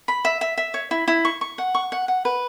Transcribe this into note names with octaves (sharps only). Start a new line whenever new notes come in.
B5
E5
E5
E5
C#5
E4
E4
C#6
C#6
F#5
C#6
F#5
F#5
B4